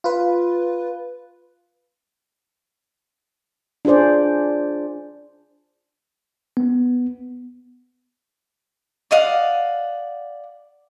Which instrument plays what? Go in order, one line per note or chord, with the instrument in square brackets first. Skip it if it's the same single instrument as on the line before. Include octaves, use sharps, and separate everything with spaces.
[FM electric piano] F4 B4
[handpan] D4 F4 G#4 C5 D5
[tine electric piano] B3
[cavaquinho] D5 D#5 F5 F#5